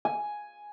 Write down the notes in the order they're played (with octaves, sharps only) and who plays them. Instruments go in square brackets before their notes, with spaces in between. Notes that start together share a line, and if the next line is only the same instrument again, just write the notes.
[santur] G#5